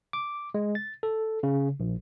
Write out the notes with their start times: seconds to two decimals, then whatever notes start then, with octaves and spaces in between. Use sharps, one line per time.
0.13 D6
0.54 G#3
0.75 A6
1.03 A4
1.43 C#3
1.80 A#1